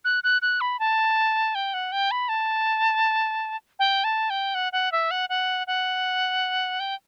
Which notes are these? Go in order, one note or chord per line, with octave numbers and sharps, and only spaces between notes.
F#6
F#6
F#6
B5
A5
G5
F#5
G5
B5
A5
G5
A5
G5
F#5
F#5
E5
F#5
F#5
F#5
G5